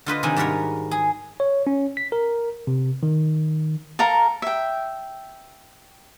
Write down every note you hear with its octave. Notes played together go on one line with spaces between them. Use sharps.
D3 F4 B4 D#5
C3 D#3 D#4 D5 G#5
G#2 G3 F#4 A#4 C#5
G#4
C#5
C#4
B6
A#4
C3
D#3
A4 A#4 F5 A#5
E5 G5